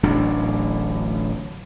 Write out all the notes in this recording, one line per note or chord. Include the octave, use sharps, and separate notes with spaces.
D1 A1 F#3 D4